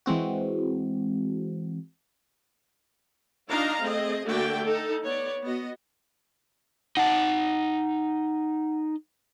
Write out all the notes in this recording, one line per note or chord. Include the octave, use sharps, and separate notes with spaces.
E3 G#3 C4 F#4
D4 D#4 F4 D#5 F5 A#5
A3 C4 G#4 D#5
D3 A3 A#3 F#4 D5 G5
D#4 A4
B3 C#5 D5
B3 F#4 D#5
D#4 F#5 A5